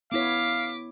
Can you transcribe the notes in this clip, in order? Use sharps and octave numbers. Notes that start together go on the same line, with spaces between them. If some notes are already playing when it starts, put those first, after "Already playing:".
B3 E4 C#5 F5 D6 B6